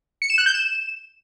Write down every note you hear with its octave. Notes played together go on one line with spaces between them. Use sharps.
C#7
E7
F#6
G6
E7